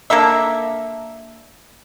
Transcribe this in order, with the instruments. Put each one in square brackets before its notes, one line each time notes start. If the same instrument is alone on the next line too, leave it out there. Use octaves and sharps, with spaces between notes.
[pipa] A#3 D4 A4 E5